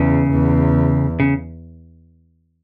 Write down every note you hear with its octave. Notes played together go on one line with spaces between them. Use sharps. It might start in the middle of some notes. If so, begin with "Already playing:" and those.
Already playing: E2 C#3
E2
C#3